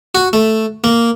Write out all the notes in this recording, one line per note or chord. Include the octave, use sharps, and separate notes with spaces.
F#4
A3
A#3